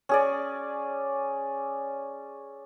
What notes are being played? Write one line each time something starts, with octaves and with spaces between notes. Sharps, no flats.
C#4 G#4 D5